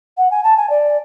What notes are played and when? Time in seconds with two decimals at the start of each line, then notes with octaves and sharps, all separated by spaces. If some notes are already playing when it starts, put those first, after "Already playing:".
0.17 F#5
0.31 G#5
0.43 A5
0.57 G#5
0.70 D5